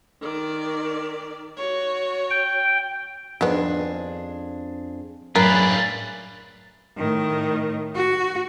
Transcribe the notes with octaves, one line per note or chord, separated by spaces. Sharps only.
D#3 D5
F#4 C#5
G5
F2 D#3 B3 D4 G#4
F#2 A2 D4 F4 G#4 A#4 B4
A2 D#3
F#4